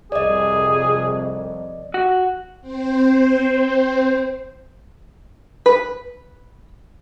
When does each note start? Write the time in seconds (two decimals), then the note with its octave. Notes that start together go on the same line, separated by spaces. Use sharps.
0.12 C2 F2 G#4 D5 D#5
1.94 F#4
2.61 C4 C5
5.66 B4